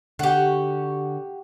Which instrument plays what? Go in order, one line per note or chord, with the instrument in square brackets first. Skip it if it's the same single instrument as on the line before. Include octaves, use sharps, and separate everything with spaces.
[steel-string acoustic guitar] D3 F#5 [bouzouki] F#4 G4